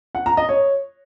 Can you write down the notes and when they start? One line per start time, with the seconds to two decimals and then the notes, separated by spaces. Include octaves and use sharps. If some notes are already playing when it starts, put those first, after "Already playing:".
0.15 F#5
0.26 A#5
0.37 D#5
0.49 C#5